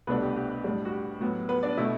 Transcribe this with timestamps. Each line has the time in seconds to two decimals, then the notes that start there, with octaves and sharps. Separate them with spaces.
0.07 C2 B2 A3 B3 D4 B4
0.22 G4
0.36 G4
0.64 A2 G3 D4
0.85 F#4
0.92 G4
1.20 A2 F#3 B3
1.49 B3 B4
1.63 D4 D5
1.77 B2 A3 E4 E5